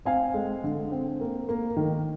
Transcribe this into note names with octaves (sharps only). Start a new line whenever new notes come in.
C4 F5 G#5
G#3
D3
C4
A#3
A#3
D#3